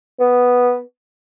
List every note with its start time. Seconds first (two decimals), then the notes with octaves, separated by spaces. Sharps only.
0.20 B3